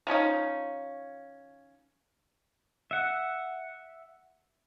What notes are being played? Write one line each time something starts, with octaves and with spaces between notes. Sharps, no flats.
D#3 F3 C#4 D#4
E5 F#5